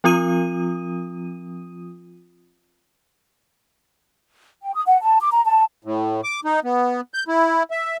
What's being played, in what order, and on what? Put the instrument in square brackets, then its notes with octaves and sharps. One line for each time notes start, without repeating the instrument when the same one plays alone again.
[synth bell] F3 C4 F4 D#6 D#7
[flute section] G5
D#6
F#5
A5
D6
A#5
A5
[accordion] A2
D6
D#4
B3
G6
E4
E5